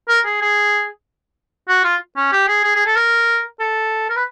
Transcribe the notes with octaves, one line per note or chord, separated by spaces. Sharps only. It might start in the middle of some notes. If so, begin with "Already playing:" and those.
A#4
G#4
G#4
F#4
F4
C#4
G4
G#4
G#4
G#4
A4
A#4
A4
A#4
B4